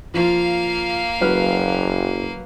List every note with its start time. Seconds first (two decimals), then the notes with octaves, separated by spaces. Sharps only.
0.14 F3 A#3 F4 F5
1.21 F#1 F#3 B4 F6